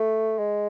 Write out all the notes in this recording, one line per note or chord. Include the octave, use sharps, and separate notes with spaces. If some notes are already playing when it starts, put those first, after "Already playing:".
Already playing: A3
G#3